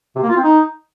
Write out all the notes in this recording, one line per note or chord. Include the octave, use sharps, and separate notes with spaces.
C3
A#3
F4
C4
D#4